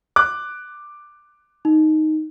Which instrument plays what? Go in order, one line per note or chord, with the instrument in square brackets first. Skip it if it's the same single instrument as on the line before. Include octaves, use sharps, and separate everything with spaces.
[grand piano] D6 F#6
[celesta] D#4